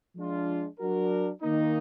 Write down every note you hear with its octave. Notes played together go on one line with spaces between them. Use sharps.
F3 G#3 D4 F4
F#3 D4 F#4 A#4
D#3 A#3 D#4